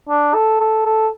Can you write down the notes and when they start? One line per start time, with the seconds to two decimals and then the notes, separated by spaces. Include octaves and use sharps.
0.09 D4
0.34 A4
0.60 A4
0.85 A4